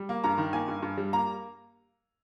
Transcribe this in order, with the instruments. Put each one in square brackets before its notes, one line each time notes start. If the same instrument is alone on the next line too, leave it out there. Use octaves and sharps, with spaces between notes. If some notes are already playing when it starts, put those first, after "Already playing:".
Already playing: [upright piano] G3
A#3
G2 A#5
D#3
A#3 G#5
G2
G2
G3
A#3 A#5